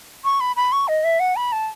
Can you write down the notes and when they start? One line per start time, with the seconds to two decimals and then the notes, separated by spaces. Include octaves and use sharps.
0.24 C#6
0.40 B5
0.56 B5
0.72 C#6
0.88 D#5
1.04 E5
1.20 F#5
1.36 B5
1.52 A5